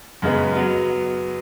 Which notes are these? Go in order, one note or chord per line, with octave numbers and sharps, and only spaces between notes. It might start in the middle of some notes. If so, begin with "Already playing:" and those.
F#2 C#3 G#3 B3
F#3 B3